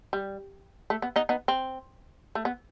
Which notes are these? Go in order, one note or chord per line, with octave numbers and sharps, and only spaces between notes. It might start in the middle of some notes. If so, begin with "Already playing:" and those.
G3
A3
B3
B3 D#4
B3 D#4
C4
A3
B3